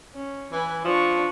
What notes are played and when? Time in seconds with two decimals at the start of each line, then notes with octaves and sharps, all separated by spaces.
0.15 C#4
0.52 E3 B4 G#5
0.85 F3 D4 C#6